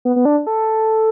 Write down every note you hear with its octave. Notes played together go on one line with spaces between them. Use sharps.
B3
B3
D4
A4